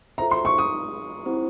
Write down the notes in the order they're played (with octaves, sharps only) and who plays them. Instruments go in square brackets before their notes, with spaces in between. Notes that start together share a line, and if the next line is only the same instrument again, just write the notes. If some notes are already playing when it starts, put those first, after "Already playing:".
[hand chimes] F4 A4 C5 E5 [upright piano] A#5
[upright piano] C6
C#6
D#6
[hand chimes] C4 E4 G4 C5